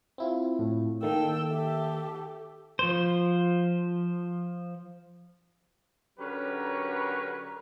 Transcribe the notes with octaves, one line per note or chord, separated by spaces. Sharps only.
C4 E4 F4
A2
D#3 A#3 A4 G5 E6
G4 A4 E5
F3 C5
D3 F#3 C#4 G4 A#4 B4